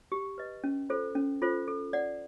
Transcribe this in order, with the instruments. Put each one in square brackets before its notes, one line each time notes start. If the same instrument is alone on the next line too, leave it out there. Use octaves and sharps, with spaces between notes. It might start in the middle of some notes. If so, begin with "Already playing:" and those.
[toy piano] G4
B4 D#5
C#4
F4 A4 C5
C#4
F4 A4 C5
A4
D5 F#5